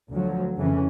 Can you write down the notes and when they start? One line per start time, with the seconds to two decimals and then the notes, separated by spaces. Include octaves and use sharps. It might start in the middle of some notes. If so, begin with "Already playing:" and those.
0.10 D2 D3 F3 F#3
0.55 F2 C#3 E3 C#4